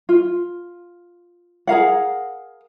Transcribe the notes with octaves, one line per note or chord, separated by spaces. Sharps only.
F4
G#4 A#4 F5 F#5